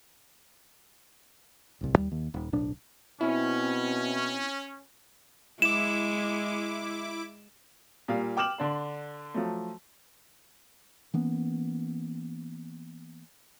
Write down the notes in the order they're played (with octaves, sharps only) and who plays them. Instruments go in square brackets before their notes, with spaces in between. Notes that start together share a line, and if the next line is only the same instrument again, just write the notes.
[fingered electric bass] D1 C2
D#2 G3
D#2
D#1
D1 B1 D4
[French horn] B2 [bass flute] C4 [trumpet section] C#4 [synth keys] E4
[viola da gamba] G#3 [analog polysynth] E4 D6 [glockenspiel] E7
[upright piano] A#2 G3 F5
G5 D6 F6 E7 F#7
D3 D4 C6
F3 F#3 A3
[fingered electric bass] E3 A#3 B3 C#4